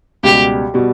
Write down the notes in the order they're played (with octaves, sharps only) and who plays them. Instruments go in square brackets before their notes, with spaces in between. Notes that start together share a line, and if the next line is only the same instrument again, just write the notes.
[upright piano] C#2 B2 G3 [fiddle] G4
[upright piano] B2 G3